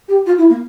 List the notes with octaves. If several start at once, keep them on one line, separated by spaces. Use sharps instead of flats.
G4
F4
E4
A#3